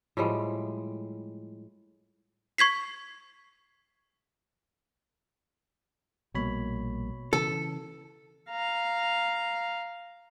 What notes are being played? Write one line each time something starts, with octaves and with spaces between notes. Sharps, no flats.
A2 F3 G3 G#3
C#6 G#6 B6 C7
A#1 B2 G3 A#3 C#5 B5
C#3 E3 A4
F5 A#5